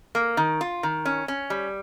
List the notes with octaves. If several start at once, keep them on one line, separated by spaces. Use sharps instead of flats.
A#3
D#3
F4
D#3
C#4
C#4
G3